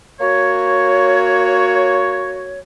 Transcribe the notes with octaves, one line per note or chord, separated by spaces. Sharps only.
A#3 F#4 C#5